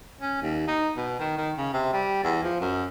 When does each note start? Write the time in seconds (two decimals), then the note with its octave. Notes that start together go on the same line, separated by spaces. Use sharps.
0.21 C#4
0.42 D#2
0.68 D#4
0.97 B2
1.20 D#3
1.38 D#3
1.58 C#3
1.74 C3
1.93 G3
2.24 E2
2.43 F3
2.61 F#2